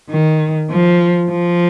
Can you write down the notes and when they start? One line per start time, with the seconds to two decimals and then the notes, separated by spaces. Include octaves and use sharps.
0.10 D#3
0.71 F3
1.31 F3